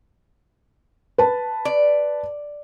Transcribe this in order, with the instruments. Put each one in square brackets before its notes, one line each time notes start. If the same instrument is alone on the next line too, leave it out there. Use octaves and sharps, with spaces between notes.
[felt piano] B4 A5
[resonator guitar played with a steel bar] D5